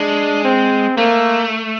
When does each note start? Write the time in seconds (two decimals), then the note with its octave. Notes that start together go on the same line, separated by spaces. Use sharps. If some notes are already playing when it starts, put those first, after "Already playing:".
Already playing: G#3 D4
0.45 C4
0.97 A3 A#3